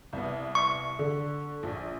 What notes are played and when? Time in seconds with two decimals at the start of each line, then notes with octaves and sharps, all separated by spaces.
0.13 C2 B3
0.55 C#6
0.99 D3
1.63 A#1